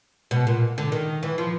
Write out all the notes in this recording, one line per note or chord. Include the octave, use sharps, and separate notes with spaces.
B2
A#2
D3
D#3
E3
F3